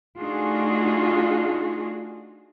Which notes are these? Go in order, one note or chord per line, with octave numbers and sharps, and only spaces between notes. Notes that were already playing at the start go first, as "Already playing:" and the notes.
A3 D4 D#4 F4 F#4 G#4